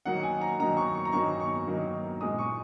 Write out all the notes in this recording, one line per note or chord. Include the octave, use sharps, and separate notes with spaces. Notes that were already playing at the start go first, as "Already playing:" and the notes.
D#3 F#3 A#3 D#4 F#5
G#5
A#5
D#3 F#3 A#3 D#4 A#5
C#6
C#6
A#5
D#3 F#3 A#3 D#4 C#6
C#6
D#3 F#3 A#3 D#4
A#2 G#3 D#4 D#6
C#6